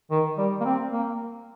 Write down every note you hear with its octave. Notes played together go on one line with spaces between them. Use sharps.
D#3
G3
A#3
C4
A#3